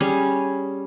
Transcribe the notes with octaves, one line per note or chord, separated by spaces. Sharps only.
G3 C#4 G#4